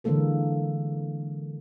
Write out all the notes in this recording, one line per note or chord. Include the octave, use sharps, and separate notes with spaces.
D3 E3 G#3 A#3 A4 A#4